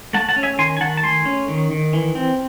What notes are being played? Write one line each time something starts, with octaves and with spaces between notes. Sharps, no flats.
A3 F#5 A5
F#5 A5
C#4
E5 G#5
D#3 G#5 C6
G#5
D#3 F#5 A5
A5
A3 G#5 C6
C#4
D#3
D#3
E3
C4